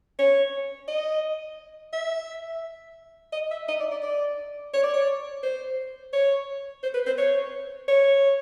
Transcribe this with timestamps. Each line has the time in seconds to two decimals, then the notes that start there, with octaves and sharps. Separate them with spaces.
0.19 C#5
0.88 D#5
1.93 E5
3.33 D#5
3.51 E5
3.68 D#5
3.80 D5
3.91 D5
4.03 D5
4.73 C#5
4.83 D5
4.94 C#5
5.43 C5
6.13 C#5
6.83 C5
6.94 B4
7.06 C5
7.18 C#5
7.88 C#5